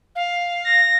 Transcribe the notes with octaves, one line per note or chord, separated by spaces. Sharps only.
F5
A#6